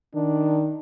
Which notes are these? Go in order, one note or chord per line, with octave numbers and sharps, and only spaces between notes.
D#3 D4